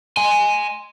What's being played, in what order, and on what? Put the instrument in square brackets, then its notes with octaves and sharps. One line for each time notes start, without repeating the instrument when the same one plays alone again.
[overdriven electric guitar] G#5 C6